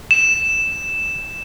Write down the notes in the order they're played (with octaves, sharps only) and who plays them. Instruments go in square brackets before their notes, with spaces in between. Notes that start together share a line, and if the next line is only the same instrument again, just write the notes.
[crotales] E7